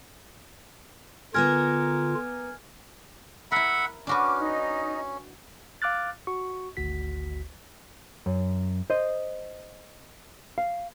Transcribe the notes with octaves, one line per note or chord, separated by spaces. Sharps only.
D3 A#3 B3 F4 A#4 G#5 F6 G#6
E4 A#4 E5 F#5 B5
C#4 D4 F#4 B4 D6 F6
D#4
F5 D6 F6 F#6 A6
F#4 C#6
G#1 D2 F#4 B6
F#2
C5 D#5
F5